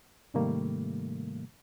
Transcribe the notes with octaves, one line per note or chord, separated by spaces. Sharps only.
G#2 C3 D#3 G3 A3 A#3